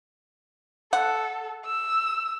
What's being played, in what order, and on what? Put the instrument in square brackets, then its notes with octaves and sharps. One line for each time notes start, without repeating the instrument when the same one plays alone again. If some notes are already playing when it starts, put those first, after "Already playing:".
[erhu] A4 [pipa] F#5
[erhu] E6